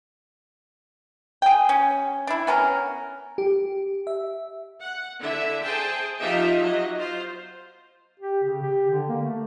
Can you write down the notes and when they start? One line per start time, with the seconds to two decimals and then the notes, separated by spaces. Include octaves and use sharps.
1.42 G#4 G5
1.69 C#4
2.27 D4 E4
2.47 B3 C#4 A#4
3.38 G4
4.07 E5
4.82 F#5
5.21 D3 E4 E5
5.63 G#4 C5 G5 A5
6.20 F3 D#4 F4 G4 D#5 E5
6.62 F#3 D#5
6.99 F4 C5
8.20 G4
8.44 C#3
8.62 G4
8.90 D3
9.09 A#3
9.23 A3